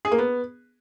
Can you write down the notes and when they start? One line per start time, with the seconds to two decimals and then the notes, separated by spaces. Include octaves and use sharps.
0.05 G#4
0.12 A#3
0.18 B3